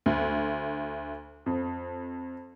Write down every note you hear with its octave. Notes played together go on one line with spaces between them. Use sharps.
D2
F2